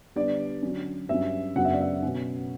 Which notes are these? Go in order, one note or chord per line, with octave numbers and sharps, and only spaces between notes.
D3 G3 B3 D4 D5
D3 F#3 C#4
G2 F#3 C#4 E5
F#2 C#3 F#3 B3 D4 F#5
E5
D5
E5
B2 F#3 C#4